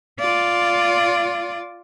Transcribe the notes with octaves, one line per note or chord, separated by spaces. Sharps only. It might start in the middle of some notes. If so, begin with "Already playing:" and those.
F4 D5